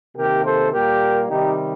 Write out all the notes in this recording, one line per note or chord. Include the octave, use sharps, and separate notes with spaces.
C3 D#3 A#3 G4 A#4
A4 C5
A#2 G3 A#3 G4 A#4
C3 D#3 G3 D#4 G4